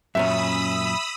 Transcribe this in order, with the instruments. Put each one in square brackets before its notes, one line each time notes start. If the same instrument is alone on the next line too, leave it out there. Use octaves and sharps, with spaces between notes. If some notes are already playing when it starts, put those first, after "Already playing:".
[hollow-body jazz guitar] F#2 A#2 C#4 [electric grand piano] E5 [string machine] B5 D#6 E6